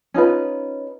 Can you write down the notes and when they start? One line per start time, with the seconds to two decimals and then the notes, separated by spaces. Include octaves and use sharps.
0.14 C#4 D#4 F4 B4